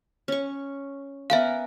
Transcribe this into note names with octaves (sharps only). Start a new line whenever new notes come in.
C#4 C#6
B3 A#4 E5 F5 G#5